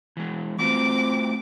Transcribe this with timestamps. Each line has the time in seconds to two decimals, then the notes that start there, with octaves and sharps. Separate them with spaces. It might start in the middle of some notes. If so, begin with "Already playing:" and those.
0.17 E3 G#3
0.59 A3 C4 F4 F#4 D6